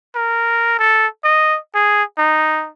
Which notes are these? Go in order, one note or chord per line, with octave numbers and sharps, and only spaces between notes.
A#4
A4
D#5
G#4
D#4